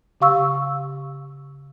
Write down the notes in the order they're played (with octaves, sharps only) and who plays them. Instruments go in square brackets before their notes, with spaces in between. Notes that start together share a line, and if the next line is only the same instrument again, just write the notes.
[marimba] C#3 G4 F5 C#6 E6